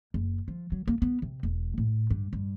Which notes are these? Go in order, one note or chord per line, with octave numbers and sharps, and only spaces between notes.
F#1
F3
F#3
A#3
B3
C3
E1
A2
G2
G2